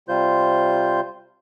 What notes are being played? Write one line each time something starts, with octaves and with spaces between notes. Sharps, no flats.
C3 G3 F4 C5 G6